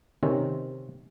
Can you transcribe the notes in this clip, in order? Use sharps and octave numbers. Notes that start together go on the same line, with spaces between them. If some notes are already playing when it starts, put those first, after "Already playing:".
C3 D#3 C4 C#4